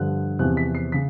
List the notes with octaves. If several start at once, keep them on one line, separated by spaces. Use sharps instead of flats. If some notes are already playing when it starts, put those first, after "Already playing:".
Already playing: G2 D3 F3 F#6
E2 C3 F3 F#6
B6
C7
C#3 B6